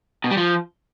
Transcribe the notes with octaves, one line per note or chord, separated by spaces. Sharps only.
B2
G3
F3